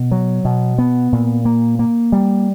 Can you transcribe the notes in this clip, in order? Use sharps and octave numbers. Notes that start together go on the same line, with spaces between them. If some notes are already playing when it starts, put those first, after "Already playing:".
Already playing: B2
F#3
B2
B3
A#2
A#3
A#3
G3